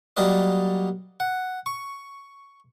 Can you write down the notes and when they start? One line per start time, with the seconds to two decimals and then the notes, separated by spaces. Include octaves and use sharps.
0.17 F#3 G3 A#3 A#4 D5 D#5
1.20 F#5
1.66 C#6